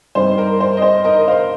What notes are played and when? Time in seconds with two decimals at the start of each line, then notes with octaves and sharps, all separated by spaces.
0.15 G2 G3 C4 D#4 C5
0.38 A#4
0.60 C5
0.77 D#5
0.82 C5
1.05 A#4 D#5
1.21 D#5
1.28 C5 F5